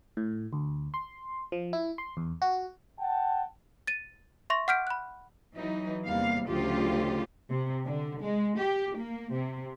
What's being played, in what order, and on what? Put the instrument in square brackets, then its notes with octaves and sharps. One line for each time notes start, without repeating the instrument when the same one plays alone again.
[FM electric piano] A2
D2
C6
F3
E4
C6
E2
F#4
[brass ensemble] F#5 G5 A5
[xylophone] A6 D#7
E5 C6 C#6 A#6
F#5 D6 F6 G6 B6 D7
B5 F#6
[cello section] E3 F#3 D#4
E2 C3 G3 A#3 F5
D2 C#3 F3 F#3 F4 G4
C3
D3
G#3
G4
A#3
C3